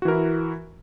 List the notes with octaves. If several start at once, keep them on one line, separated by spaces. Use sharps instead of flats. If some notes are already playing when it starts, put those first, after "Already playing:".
E3 E4 F#4 A#4